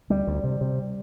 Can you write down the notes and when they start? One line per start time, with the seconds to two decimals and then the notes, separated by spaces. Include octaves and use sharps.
0.10 D2 G3
0.27 D2
0.44 C3
0.61 C3